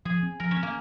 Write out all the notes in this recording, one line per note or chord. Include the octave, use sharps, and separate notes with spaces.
F3 G#4
C4
F3 A#4
C#4
C4
A#3